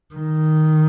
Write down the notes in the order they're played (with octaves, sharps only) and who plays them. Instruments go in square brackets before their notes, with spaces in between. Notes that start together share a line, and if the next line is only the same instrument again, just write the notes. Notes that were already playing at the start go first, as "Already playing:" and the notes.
[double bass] D#3